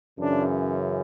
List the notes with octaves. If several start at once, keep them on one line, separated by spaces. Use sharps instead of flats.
F#2 C#3 E3 D4